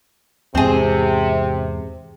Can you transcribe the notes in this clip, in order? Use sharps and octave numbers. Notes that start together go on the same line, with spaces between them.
E2 G#2 C3 C4 G#4